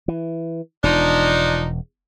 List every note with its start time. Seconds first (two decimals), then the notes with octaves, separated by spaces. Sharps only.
0.08 E3
0.83 E1 F3 D4 D#4